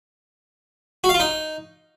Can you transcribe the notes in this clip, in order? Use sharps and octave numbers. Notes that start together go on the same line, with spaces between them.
F#4
F5
F4
D#4